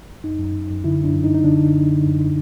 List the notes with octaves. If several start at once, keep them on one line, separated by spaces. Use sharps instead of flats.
F#2 D#4
F#2
F#2
F#2
D3 E4
F#2 D4
F#2
D#4
F#2
D#4
D3 D4
D3
F#2
D3
F#2